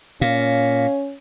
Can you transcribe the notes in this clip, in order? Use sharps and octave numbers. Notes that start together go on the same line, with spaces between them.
A#2 C#4 F5